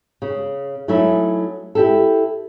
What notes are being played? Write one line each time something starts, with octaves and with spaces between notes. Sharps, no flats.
C#3
F#3 A3 C#4 D#4 E4
E4 G4 A4